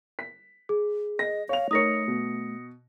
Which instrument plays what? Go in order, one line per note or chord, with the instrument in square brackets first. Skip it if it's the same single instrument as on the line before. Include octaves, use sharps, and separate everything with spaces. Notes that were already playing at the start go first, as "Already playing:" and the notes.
[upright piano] B6
[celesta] G#4
[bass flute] D#5 [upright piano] A#6
[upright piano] C#5 F7 [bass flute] F5
[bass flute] A3 [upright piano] D#4 A#4 C#5 [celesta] D#6 A#6 C#7
[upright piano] B2